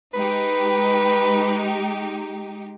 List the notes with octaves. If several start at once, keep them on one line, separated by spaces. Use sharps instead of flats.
G#3 D#4 G4 B4